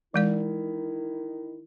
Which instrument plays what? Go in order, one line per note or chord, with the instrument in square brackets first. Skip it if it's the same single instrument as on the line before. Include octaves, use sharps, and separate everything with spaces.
[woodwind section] D#3 E4 [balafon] E3 G#3 D5